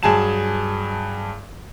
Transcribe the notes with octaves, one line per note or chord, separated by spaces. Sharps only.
G2 F#3 G#4 G#5 A5 E7